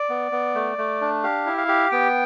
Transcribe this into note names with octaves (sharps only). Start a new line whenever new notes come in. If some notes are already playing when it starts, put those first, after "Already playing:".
Already playing: D5
B3
B3
A3
A3
D4
G4 F5
E4
F5
G4
B3 G5